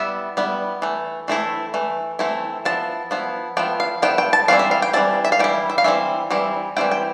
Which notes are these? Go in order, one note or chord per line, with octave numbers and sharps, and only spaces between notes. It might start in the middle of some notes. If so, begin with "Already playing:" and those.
Already playing: G3 B3 E4 E5
G3 B3 E4
E3 A3
E3 A3 C4 E4
E3 A3
E3 A3 C4 E4
F3 B3 E4 A5
F3 B3 E4
F3 B3 E4 G5
F5
F3 B3 E4 G5
G5
A5
E3 G3 C4 E4 F5
E5
F5
G5
E3 G3 C4 E4 A5
E5
F5
E3 G3 E4 G5
E5
F5
E3 G3 C4 E4 E5
E3 G3 C4 E4
E3 G3 C4 E4 G5
G5